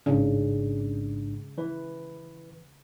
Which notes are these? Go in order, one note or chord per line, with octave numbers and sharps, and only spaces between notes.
A1 G#2 C#3 D4
E3 B4